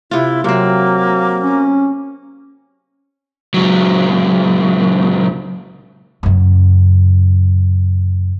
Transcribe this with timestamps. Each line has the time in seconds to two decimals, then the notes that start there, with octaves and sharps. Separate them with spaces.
0.11 C3 E4 F4
0.44 C3 F#3 A#3 C4
1.42 C#4
3.54 C#2 F#3
6.23 F#2 C#3